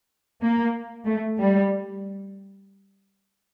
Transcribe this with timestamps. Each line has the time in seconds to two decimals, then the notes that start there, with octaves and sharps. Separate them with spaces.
0.41 A#3
1.06 A3
1.39 G3